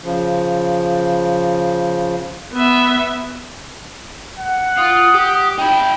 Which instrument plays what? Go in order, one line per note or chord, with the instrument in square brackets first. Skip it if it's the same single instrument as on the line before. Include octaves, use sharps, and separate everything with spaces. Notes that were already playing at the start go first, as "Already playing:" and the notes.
[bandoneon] C#3 F3
[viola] B3 E5
[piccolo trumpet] F#5
[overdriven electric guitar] F4 [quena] D#6
[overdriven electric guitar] G4
[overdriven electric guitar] D#4 B5 [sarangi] G5